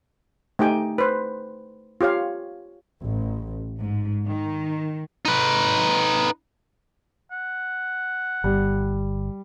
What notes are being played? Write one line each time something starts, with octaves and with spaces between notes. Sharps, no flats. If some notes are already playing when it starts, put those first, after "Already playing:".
A3 D#4 G4 G5 G#5
B4 C5
F4 G4 C#5 F5
A1
G#2
D#3
D#4 B4
F#5
G1 G3